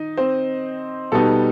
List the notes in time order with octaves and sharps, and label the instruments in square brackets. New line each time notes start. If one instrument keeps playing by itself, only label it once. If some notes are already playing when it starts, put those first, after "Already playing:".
Already playing: [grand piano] D#3 D#4 D#5
C4 C5
B2 G3 B3 D#4 A4